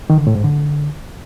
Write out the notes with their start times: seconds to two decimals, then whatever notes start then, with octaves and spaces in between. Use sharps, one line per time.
0.10 D#3
0.18 D3
0.27 A2
0.35 G#2
0.44 D3